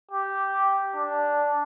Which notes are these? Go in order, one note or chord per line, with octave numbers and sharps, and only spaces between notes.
G4
D4